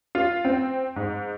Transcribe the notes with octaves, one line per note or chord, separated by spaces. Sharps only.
F4
C4
G#2